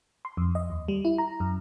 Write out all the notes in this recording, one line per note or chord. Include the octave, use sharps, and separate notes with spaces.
C6
F2
D#5
D#2
G3
E4
A#5
F#2